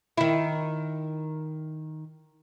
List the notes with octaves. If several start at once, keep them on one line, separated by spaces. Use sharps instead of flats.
D#3 E4